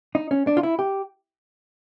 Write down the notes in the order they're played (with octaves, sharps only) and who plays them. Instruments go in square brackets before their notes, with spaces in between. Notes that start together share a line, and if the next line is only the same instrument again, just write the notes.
[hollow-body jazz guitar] D#4
C#4
D4
F4
E4
G4